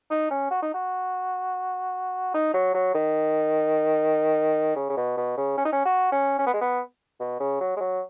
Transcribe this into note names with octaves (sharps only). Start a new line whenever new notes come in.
D#4
C#4
F#4
D#4
F#4
D#4
F#3
F#3
D#3
C#3
C#3
B2
B2
C#3
C#4
D#4
C#4
F#4
C#4
C#4
B3
G#3
B3
B2
C#3
F#3
G#3
F#3